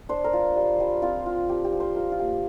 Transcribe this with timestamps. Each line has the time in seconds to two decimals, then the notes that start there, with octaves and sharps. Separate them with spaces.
0.09 D4 C5
0.24 A#4
0.33 F4
0.56 G3
0.80 G3
1.02 C4 F4
1.26 F4
1.49 F3 G4
1.64 G4
1.73 F3
1.80 C5
1.95 F4 A#4
2.12 F4
2.19 A#3 G4